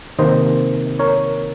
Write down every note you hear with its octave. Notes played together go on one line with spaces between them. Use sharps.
C3 D#3 A#3 C5 D#5
A#4 C#5